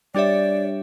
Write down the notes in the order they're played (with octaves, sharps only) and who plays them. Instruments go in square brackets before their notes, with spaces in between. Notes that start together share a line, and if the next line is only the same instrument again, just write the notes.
[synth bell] G3 D4 G4 C#5 E5 [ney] D5